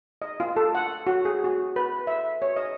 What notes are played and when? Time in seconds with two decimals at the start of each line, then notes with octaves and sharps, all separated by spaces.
0.22 D#5
0.40 F4
0.56 A4
0.75 F#5
1.07 F#4
1.25 G#4
1.44 F#4
1.76 B4
2.07 E5
2.42 C#5
2.56 D#5